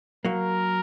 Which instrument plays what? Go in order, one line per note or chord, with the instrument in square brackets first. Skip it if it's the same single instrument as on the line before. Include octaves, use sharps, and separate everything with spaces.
[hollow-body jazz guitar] F#3 A#3 [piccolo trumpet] A#4